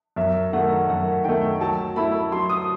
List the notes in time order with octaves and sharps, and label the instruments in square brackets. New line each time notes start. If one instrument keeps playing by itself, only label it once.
[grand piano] F#2 [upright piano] E5
[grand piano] D#3 A3 [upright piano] F#5
[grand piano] F#2 [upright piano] F#5
[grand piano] D#3 A3 [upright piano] G5
[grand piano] F#3 [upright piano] A5
[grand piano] A3 E4 [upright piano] B5
[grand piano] F#3 [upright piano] C6
[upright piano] D#6